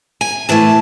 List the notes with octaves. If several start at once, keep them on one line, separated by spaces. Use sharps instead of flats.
G#5
A2 E3 A3 A5